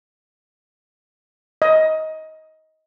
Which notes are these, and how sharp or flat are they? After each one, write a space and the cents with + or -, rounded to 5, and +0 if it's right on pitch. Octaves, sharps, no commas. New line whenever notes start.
D#5 +20